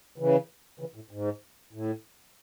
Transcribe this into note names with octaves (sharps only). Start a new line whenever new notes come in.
C#3 E3
C#3 E3
A2
G#2
A2